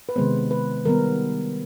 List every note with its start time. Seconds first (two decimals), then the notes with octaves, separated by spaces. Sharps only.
0.09 B4
0.16 C3 D#3 G#3 B3 C5
0.51 B4
0.85 D#3 G3 B3 A#4